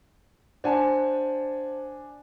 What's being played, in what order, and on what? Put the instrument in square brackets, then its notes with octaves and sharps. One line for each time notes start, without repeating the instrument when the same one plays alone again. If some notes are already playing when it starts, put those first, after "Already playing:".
[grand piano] D4 G#5 [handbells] C5 F#5 A5